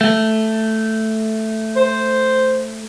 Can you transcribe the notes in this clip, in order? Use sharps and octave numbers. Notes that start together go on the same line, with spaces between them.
A3
C5